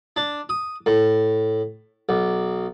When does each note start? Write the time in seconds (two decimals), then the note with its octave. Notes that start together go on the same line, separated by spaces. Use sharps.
0.16 D4
0.49 D#6
0.86 A2
2.09 B1